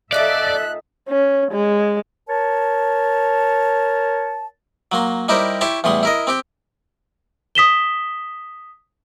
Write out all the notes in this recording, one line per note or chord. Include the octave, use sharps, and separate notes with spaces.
A#2 D#4 A4 D5 E5 F5 F#6
C#4
G#3
A#4 C#5 A5
F#3 A#3 C6
G3 D#4 E4 G4 A#4 C5
E4 G4 C#5 A5 C6 C#6
E2 A2 G3 C6 D#6
E4 A#4 D#5
C4 G4 G5
D#6 B6 E7 G7